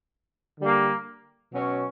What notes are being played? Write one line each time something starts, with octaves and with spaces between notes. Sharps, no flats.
D3 G3 A#3
B2 F#3 C#4